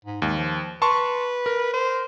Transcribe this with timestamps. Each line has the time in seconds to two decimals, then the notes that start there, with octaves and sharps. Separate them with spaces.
0.05 G#2
0.22 D#2 G#3
0.37 F3
0.82 B4 A5 C6 C#6
1.46 A#4
1.74 C5